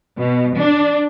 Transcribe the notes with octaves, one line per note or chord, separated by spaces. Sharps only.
B2
D4